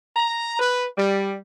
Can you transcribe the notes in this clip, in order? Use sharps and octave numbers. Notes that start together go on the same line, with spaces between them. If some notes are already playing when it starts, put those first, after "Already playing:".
A#5
B4
G3